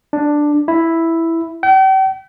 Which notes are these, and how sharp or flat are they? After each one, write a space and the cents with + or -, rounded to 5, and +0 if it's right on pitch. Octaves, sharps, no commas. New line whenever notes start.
D4 +5
E4 +0
G5 -40